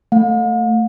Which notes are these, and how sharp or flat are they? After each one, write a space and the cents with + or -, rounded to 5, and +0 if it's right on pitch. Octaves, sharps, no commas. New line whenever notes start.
A3 +20 F5 +45